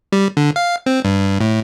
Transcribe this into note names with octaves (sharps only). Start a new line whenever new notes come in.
G3
D3
F5
C4
G2
A2